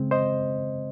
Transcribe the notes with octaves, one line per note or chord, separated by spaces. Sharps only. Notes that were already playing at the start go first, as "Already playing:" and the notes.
Already playing: C#3 G#3 C4
C5 D#5